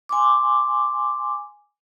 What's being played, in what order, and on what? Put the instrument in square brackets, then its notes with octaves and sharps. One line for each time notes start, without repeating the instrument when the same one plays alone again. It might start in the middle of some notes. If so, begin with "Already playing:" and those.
[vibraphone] G#5 C6 D6